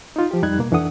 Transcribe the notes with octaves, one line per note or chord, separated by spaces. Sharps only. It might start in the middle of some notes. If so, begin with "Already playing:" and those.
D#4 F4
F3 G4
F2 G3 D#4 F#6 G#6
B2 A#3
F2 E3 D4 A4 F#5 D#6